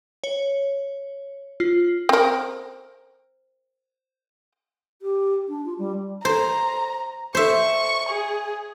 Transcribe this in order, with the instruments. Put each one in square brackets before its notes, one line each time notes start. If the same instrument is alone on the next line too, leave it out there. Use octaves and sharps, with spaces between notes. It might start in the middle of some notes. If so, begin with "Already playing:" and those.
[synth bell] C#5
F4
[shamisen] C4 A#4
[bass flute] G4
D4
F4
G3
[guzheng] C5 [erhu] A#5
[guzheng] C5 E5 [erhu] C#6
[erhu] G#4